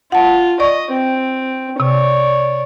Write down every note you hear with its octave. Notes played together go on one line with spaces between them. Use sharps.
F4 F#5 A5
D5 D#5 C#6
C4
C3 C#5 D5